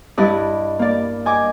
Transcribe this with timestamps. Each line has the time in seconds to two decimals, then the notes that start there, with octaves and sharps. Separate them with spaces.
0.18 G2 E4 D5 D#5
0.79 A#3 D5
1.26 D#5 G#5 D6